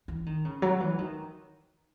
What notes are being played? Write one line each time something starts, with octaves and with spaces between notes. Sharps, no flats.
E3
D#3
C#3
F#3
E3
D#3